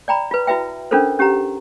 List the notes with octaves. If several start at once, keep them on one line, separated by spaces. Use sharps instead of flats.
D5 G5 A#5 B5
F4 B4
E4 F#4 B4 E5 G5
C#4 D4 F4 A4 A#4 C5
C#4 G4 F#5 A#5